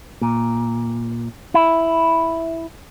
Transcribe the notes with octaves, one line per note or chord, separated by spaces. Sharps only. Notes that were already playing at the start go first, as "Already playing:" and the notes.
A#2
E4